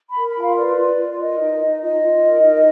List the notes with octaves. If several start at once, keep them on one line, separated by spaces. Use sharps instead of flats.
B5
A#4
B5
F4
F5
B4 D5
F4
F4
D5
A#4 D#5
D#4
D#4
F4 D#5
F4
A#4
D#4